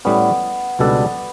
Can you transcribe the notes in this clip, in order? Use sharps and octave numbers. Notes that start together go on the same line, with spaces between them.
A2 G3 B3 C#4
C#2 B2 G3 D4 A4